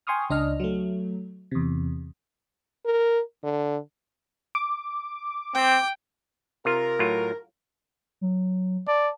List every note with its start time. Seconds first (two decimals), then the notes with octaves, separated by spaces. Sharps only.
0.07 G5 G#5 C6 C#6 D#6 F6
0.30 C#2 D4 D#5 F6
0.60 F#3 A3
1.51 E2 C3
2.85 A#4
3.43 D3
4.55 D6
5.55 C4 G5
6.65 C3 F4 A#4
6.99 A2 F#3 F4
8.21 F#3
8.87 D5 A5